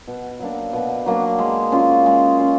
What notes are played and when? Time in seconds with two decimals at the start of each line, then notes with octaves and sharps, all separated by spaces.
0.08 B2
0.40 F#3 A#3 D4
0.73 B2
1.06 F#3 A#3 D4
1.39 G#3
1.72 C#4 F4
2.06 G#3
2.39 C#4 F4